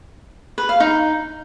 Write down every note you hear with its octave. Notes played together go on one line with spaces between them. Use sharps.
B4
F5
D#4